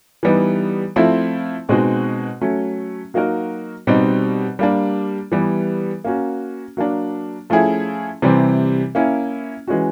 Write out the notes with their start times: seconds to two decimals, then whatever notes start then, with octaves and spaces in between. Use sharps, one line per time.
0.23 E3 G3 B3 D#4
0.96 F3 A3 C4 E4
1.69 B2 G#3 C4 D#4 F#4
2.41 F#3 A3 C#4
3.14 F#3 A#3 D#4 F#4 A#4
3.87 B2 G3 C4 D#4
4.59 G3 A#3 D4
5.32 E3 G3 B3
6.04 A#3 C#4 F#4
6.77 F#3 A#3 D4
7.50 F3 A3 C#4 E4 G#4
8.22 C3 E3 G3 C4
8.95 A#3 C#4 E4
9.67 E3 G#3 C#4 F#4